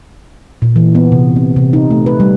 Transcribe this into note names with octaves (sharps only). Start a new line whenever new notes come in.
A#2
E3
B3
C3
C4
C3
D#4
A3
B4
G3